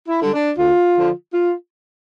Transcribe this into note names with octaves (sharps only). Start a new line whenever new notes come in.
E4
D3 G3
D4
D2 F4
D3 F3
F4